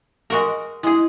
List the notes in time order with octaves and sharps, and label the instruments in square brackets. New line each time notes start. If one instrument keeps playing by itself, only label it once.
[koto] G#3 F#4 A#4
[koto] G#3 G#4 [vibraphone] E4